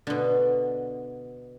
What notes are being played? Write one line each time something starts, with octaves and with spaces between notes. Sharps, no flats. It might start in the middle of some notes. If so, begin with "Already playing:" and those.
B2 D3